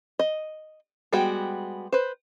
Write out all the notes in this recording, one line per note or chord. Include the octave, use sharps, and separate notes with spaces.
D#5
G3 G#3 B3 F#4 G5
B4 C5